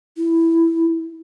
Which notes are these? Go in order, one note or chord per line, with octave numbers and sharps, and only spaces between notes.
E4